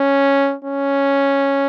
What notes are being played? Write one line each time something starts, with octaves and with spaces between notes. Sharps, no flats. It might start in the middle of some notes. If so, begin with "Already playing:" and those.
Already playing: C#4
C#4